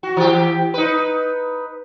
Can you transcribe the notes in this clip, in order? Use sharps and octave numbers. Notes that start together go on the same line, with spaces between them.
F#4
E3 G4
D#4 B4